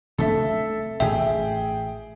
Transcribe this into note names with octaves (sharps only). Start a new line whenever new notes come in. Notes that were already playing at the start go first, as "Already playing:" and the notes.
C3 A3 D4 A4 E5
A1 A2 G#4 E5 G5